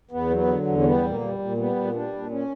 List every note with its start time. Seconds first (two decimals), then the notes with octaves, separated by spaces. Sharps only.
0.11 E2 B3
0.30 F#3
0.37 B3
0.47 D3
0.67 E2
0.79 C#4
0.84 G3 B3
1.03 A#2
1.09 A#3
1.22 G3
1.39 A#2
1.57 G3 B3
1.76 A#2
1.94 G3 D4
2.13 A#2
2.31 C#4